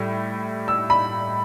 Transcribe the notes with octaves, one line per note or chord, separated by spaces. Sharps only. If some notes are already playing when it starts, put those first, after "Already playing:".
Already playing: A2 G3
E6
B5